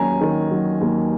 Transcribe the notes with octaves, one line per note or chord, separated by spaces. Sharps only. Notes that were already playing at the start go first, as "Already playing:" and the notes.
Already playing: D#2 F#3 C#4 G#5 A#5
D#3
F#3
D#2